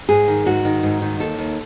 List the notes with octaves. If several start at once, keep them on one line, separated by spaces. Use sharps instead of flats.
G#2 G#4
D#3
G#2 F#4
D#3
G#2
D#3
D#2 A4
D#2